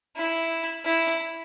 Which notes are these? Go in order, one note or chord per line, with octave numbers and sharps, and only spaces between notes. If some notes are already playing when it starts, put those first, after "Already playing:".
E4
E4